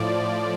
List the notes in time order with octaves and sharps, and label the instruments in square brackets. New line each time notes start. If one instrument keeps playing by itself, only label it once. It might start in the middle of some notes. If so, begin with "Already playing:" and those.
Already playing: [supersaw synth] A2 F3 D5